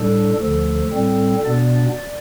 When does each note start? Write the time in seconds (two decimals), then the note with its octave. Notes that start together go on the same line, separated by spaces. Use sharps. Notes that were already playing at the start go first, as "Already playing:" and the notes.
Already playing: A2 G3 D4 A4
0.40 D2 D3 F3 A4
0.92 A2 G3 C4
1.44 B2 B3 D4 D5